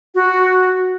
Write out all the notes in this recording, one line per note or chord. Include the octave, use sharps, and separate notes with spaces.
F#4